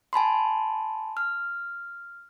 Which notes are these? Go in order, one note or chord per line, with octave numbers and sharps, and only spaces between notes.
G#5 A5 B5 C6
F6